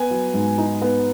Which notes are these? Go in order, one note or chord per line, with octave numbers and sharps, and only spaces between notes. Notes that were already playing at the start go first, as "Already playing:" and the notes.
Already playing: B3 G#5
F#3
G#2
D#4
B3